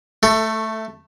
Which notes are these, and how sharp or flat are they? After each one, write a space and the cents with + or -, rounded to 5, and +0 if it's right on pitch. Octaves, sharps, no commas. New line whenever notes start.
A3 +0 A4 +20